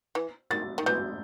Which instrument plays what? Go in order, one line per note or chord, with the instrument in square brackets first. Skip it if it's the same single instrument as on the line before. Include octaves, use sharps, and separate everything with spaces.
[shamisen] E3
[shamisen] D#3 [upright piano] A6
[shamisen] D#3
[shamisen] E3 [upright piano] G6